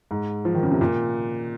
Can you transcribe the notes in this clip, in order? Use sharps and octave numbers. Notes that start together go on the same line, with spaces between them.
G#2
F3
D#3
C#3
C3
A#2